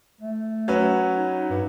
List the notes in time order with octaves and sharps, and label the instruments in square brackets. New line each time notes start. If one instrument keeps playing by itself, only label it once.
[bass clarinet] A3
[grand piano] F#3 C#4 B4
[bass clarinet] D#4
G2